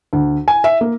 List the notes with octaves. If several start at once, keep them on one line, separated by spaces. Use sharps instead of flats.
D2
G#5
E5
A#3